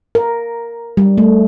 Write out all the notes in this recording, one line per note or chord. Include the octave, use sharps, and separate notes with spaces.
A#4
G3
A3